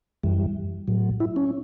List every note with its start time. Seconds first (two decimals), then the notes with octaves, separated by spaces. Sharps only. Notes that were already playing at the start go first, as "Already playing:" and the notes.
0.23 F#2 E3 G3
0.88 A2 F#3
1.20 E4
1.36 C#4